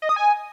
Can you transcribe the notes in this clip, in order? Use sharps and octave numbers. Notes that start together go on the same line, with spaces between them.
D#5
D#6
G#5